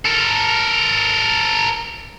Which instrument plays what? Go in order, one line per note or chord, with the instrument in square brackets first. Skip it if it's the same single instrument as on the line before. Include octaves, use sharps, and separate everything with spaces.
[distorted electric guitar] A4 A#4